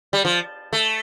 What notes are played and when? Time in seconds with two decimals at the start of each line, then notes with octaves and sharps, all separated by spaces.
0.13 G3
0.25 F3
0.73 A3